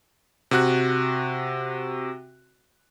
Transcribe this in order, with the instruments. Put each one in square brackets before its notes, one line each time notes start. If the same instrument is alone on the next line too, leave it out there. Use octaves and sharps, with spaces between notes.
[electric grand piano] C3 F#4 F#6